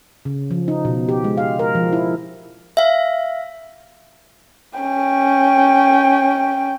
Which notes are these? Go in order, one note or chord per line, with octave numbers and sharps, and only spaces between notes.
C#3
F3
D#4
B2
G4
G#3
F5
A#4
F3
E4
E5 F5
C#4 G5